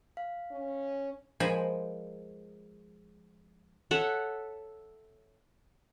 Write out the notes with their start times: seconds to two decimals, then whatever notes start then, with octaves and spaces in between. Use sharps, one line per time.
0.17 F5
0.51 C#4
1.40 F3 G#3 A#4 C5 G#5 B5
3.91 A4 C#5 E5 F#5